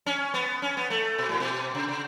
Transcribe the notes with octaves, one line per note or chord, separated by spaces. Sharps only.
C#4
B3
C#4
B3
A3
B2
A2
B2
C#3
C#3